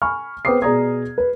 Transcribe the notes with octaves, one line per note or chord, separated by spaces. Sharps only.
G#5 B5 C#6 F6
B3 C4 G5 D6 D#6 C7
B2 G#4 D5 A#5 D#6 G#6
B4